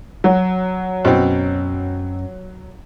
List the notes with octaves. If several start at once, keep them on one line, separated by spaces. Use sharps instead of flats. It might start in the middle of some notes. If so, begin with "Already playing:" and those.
F#3
F#2 B2 C4 C#4